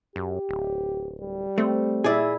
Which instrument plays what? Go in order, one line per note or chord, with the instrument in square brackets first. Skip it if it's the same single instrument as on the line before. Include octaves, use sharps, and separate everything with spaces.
[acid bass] F#2 [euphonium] G4
[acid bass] D1
[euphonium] G3
[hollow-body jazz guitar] A3 [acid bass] C4
[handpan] A#2 E4 E5 [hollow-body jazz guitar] G#4 D5